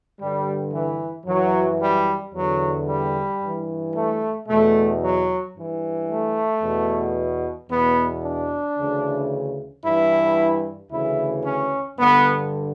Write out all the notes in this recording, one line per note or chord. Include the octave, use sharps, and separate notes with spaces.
G2 D3 G3
E3
F#2 E3 F#3
G3
E2 D3 F#3
G3
G2 E3
A3
E2 B2 A3
F#3
G2 E3
A3
E2 B2
E2 B2 B3
D4
D2 C#3 E3
G2 E3 E4
D2 C#3 E3 E4
C#4
G2 D3 B3